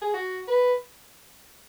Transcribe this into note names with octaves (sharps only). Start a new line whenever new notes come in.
G#4
F#4
B4